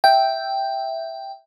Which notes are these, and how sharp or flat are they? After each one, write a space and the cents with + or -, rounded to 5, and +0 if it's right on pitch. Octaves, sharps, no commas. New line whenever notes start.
E5 +0 G5 +0